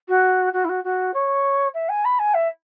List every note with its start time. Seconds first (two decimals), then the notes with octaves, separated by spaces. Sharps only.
0.09 F#4
0.53 F#4
0.64 E4
0.69 F#4
0.84 F#4
1.14 C#5
1.74 E5
1.89 G#5
2.05 B5
2.19 G#5
2.34 E5